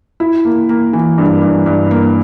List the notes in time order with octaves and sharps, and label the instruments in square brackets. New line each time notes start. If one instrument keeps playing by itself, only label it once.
[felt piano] E4
A#3
A#3
E3
G2
G2
G2
A#3